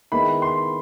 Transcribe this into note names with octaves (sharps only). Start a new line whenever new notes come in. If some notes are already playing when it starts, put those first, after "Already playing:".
D#3 G#3 B3 E4 B5
C6